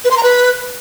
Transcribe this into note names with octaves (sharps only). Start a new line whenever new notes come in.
B4
C6
A#5
B4